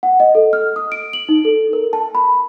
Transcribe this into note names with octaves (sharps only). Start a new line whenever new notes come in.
F#5
D#5
A4
F6
D#6
D7
F#7
D#4
A4
A#4
A5
B5